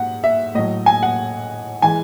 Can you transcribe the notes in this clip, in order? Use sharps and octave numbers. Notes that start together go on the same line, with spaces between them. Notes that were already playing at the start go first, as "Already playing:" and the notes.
Already playing: G#2 F#5
E5
A2 F#3 D#5
G#5
F#5
E3 G#3 G#5